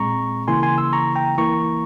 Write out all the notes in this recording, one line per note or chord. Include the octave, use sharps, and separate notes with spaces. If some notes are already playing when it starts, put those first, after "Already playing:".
Already playing: A#2 G#3 C4 A#5 C#6
C#3 E3 A#3 E4 G#5 C6
G#5 C6
C6 E6
A#5 C#6
G5 A#5
E3 A#3 E4 A#5 C#6